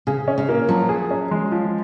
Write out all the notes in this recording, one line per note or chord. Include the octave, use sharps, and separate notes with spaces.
C#3 G#4
C#4
C#3
A#3
F3 F#3
G#4
C#4
G#3
F3